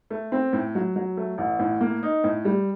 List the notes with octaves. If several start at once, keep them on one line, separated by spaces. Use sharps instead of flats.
A3
C4
A2
F#3
F#3
A3
A1
A2
A#3
D#4
A2
G3